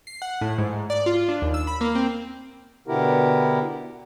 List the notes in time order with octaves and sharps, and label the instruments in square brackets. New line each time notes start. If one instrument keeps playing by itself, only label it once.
[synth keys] C7
F#5
A2
G#2
D5
F4
D4
D#2
E6
B5
A#3
C4
[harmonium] B2 D3 B3 E4 G4 A#4